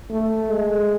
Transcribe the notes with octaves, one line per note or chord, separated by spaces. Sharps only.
A3
G#3